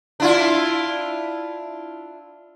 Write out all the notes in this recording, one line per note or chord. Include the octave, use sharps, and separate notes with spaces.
D4 E4 F4